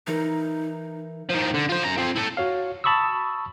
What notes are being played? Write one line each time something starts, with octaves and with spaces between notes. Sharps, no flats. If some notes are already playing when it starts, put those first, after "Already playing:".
E3 D#4 A#4
D#3 F3
D3
F4 C5
F#2 A#5
F3 C4
E4 A4
F#4 C#5 F5
A5 B5 C#6 D#6 E6